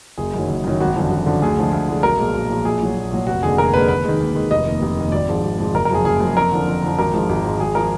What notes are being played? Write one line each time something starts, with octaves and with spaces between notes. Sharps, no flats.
F#1 G#4
F#2 D#3 F#3
F#1
F#2 D#3 F#3
G#1 F#4
F#2 D3 F3
G#1
F#2 D3 F3
D2 G#4
D3 F3 G#3
D2
D3 F3 G#3
B1 A#4
A#2 F3 G#3
B1
A#2 F3 G#3
A#1 G#4
A#2 F#3
A#1
A#2 F#3
F1 F#4
D#2 D3 G#3 G#4
F1 A#4
D#2 D3 G#3 B4
D#2 B4
D#3 G#3
D#2
D#3 G#3
F1 D#5
D#2 D#3
F1
D#2 D#3
G#1 D5
G#2 F3 G#3
G#1
G#2 F3 G#3
F#1 A#4
A#4
F#2 F3 G#3 G#4
F#1 G#4
F#2 F3 G#3
F2 A#4
D3 F3
F2
D3 F3
G#1 A#4
G#2 F3 G#3
G#1
G#2 F3 G#3
G#1 G#4
F3 G#3 A#4